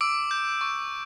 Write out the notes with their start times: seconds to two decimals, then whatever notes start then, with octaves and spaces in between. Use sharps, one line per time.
0.01 D6 E6 D7
0.31 G6
0.61 C#6